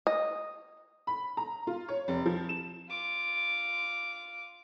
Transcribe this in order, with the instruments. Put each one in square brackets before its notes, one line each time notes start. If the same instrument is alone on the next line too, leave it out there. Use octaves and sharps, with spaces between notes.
[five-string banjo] D#5
[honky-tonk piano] B5
A#5
F4
C#5
F1
F3
E7
[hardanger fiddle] F4 D6